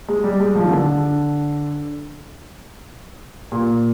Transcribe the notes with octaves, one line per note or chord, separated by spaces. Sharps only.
G#3
G3
G#3
F3
D#3
D3
A#2